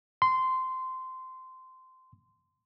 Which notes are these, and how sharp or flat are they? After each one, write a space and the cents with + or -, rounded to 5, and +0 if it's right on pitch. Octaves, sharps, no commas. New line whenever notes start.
C6 -15